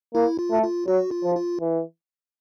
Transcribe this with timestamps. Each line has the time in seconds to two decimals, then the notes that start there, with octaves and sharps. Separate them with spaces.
0.15 A#3 E4
0.39 F4
0.51 A3
0.63 F4
0.87 F#3 F#4
1.11 F4
1.24 F3
1.36 F4
1.60 E3